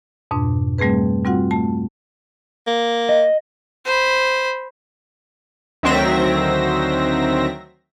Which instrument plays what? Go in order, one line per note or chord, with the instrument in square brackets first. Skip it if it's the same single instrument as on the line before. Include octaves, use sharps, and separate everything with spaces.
[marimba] F2 G#2 B2 D4
G3 A3 C4 G#4 B4
G3 C4 F4 F#4 F#5
A3 A5
[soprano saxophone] A#3
[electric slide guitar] D#5
[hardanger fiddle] C5 B5
[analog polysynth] D2 D#3 F#3 C4 E5 A#6